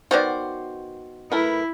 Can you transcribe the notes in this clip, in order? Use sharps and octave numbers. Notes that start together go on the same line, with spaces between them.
D#3 B3 F#4 C5 D5
A3 E4 A#4 B4